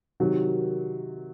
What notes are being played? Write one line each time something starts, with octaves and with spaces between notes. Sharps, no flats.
C3 D#3 F#3